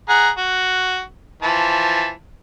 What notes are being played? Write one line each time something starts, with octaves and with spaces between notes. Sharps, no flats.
G#4 F#5 A#5
F#4
E3 F3 A5